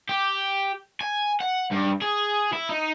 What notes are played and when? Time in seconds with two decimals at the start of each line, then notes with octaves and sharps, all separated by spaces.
0.09 G4
1.01 G#5
1.40 F#5
1.71 G2
2.01 G#4
2.53 E4
2.69 D#4